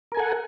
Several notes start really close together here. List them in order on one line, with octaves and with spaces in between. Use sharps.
A#4 G#5 A4 F#5